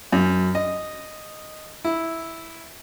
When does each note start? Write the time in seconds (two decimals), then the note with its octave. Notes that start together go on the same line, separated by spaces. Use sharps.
0.12 F#2
0.55 D#5
1.85 E4